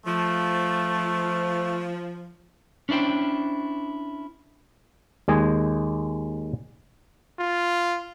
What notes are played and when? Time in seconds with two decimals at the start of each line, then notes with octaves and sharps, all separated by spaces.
0.06 F3 A3
2.89 C#4 D4 E4 C5 G5
5.28 D#2 G#3 D#5 G#5
7.39 F4